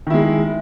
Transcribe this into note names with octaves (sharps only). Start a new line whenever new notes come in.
D#3 G#3 E4